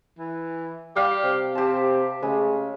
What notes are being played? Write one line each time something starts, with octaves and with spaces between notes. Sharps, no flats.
E3
G3 G4 F5
C3
C4 G4 A5
C#3 G#3 A3